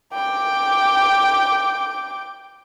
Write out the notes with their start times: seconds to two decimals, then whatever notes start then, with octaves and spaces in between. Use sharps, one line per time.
0.14 G5 D6